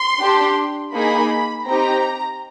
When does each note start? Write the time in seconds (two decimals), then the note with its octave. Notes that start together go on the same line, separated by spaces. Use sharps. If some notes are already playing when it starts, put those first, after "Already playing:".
Already playing: C6
0.19 D4 G4
0.92 A#3 D#4 G#4 B5
1.66 C4 D#4 G4 A#5